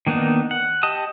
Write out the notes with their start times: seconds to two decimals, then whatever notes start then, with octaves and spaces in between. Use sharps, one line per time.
0.07 D#3 A#3 B3 D4 D#4
0.51 F#5
0.83 G4 D#5 A5 D#6